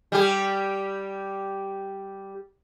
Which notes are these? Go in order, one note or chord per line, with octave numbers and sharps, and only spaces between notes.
G3 G4